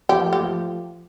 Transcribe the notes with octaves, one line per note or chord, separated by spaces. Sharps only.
F3 G4
A3
G4
F3